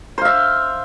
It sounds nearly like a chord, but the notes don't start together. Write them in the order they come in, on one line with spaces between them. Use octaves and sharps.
C5 F5 E5